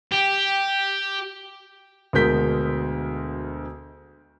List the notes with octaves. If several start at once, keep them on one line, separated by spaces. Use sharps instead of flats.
G4
D2 B2 G#3 A#4 G6 B6